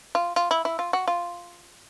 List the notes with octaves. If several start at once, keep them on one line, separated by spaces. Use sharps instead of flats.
F4
F4
E4
E4
F4
F#4
F4